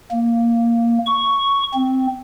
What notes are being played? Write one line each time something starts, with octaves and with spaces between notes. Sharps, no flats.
A#3
C#6
C4